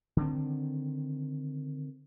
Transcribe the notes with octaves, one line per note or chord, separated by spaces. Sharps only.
D3 D#3 C4